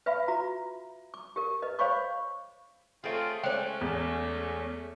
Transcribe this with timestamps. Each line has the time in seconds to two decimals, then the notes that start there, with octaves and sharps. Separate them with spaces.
0.06 B4 E5 F5 B5
0.28 F4 F#4 A#5
1.14 D6
1.36 G4 A#4
1.62 B4 D#5
1.79 C5 C#5 F5 B5 C#6 D6
3.04 A3 C4 C#4 F4 G#4
3.43 G#3 A3 C#4 C5 D5 G5
3.81 E2